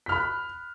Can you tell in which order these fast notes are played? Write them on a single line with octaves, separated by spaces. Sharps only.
B6 F6 B5 F#6